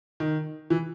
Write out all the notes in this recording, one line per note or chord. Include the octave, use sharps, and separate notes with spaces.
D#3
E3